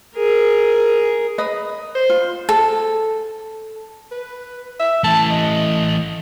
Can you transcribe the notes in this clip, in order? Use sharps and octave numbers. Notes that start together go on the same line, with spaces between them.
G#4 A#4
B4 D#5
C5
F4
A4
B4
E5
E3 A3 A5
D#5